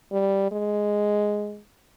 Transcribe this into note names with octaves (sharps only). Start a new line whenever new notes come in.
G3
G#3